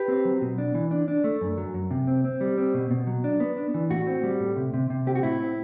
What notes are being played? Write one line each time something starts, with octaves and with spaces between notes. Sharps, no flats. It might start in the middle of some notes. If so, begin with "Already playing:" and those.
Already playing: G4 B4
C4
F#3
B2
D4
E3
D4
D4
A3
F#2
F#3
F#2
C3
C4
C4
G3
C4
B2
B2
F#3
D4
B3
D4
E3
A2 F#4
C4
G3
A2
C3
C3
C3
C4 G4
F#4
A2 E4
C4